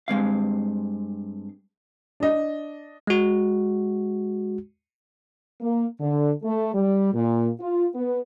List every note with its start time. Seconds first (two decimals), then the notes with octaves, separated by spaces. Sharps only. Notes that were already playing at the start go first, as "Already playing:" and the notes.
0.08 G2 G#3 C4 F5
2.20 D4 D#5
3.07 G#3 F#4
5.61 A#3
5.99 D3
6.42 A3
6.73 G3
7.13 A#2
7.60 F4
7.93 B3